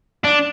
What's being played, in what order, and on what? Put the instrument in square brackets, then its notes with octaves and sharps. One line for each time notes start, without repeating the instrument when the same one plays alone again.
[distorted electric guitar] D4